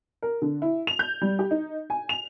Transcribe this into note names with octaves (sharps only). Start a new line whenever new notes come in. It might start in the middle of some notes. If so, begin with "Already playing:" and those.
A#4
D3
E4
F7
G6
G3
G4
D#4
G#5
F7